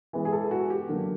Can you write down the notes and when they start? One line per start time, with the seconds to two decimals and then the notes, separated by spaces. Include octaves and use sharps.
0.13 E3 G#3 B3
0.25 G#4
0.32 A4
0.51 F#4
0.70 G4
0.89 D3 F#3 A#3